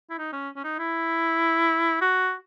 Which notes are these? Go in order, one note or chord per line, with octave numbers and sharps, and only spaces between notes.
E4
D#4
C#4
C#4
D#4
E4
F#4